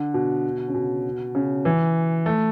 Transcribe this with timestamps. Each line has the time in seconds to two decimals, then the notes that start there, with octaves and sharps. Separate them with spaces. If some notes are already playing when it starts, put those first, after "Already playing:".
Already playing: D3
0.14 B2
0.68 C#3
0.74 B2
1.35 C#3
1.65 E3
2.26 A3